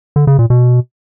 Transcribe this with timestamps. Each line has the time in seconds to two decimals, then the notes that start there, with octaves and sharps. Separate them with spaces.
0.16 D3
0.27 C#3
0.39 A#2
0.50 B2